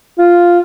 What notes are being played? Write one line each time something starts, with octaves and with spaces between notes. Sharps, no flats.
F4